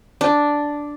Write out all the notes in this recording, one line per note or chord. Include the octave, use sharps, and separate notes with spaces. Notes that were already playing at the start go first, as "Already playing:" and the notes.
D4